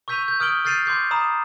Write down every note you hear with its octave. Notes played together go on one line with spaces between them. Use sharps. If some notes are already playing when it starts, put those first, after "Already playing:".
C#6 E6 G6 B6 D#7 F7
G6
D#6 F6 G#6 D7 F#7 G7
F6 G6 A6 C7 D#7 F7
C6 D6 G6 C7
A#5 B5 D#6 G6 E7